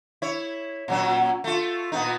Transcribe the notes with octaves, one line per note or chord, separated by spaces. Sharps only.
E4 C#5
A#2 F#3 C#4
A3 F4
A#2 B3 D#4